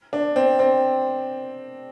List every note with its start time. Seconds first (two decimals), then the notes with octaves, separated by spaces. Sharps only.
0.13 D4
0.36 C4
0.59 C4